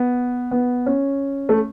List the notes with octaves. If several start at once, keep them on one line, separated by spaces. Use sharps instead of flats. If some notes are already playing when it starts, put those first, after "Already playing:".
Already playing: B3
B3
C#4
A3